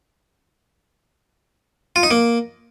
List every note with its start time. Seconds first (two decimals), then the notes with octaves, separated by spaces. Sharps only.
1.96 F4
2.03 D#4
2.11 A#3